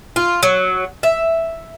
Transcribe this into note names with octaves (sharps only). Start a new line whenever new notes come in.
F4
F#3
E5